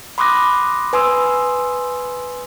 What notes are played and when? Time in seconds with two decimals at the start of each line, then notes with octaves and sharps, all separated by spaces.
0.18 B5 C6 D6 D#6 F#6 A#6
0.93 B4 G#5 C6 D#6 E6